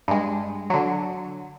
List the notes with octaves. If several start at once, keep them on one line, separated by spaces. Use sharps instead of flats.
G2 G#3
D3 F#3